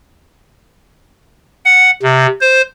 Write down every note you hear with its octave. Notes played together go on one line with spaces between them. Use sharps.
F#5
C3
C5